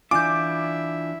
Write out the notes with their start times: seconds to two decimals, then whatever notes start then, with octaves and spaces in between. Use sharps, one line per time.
0.11 E3 D4 E4 F4 E5 G#5 D6 G6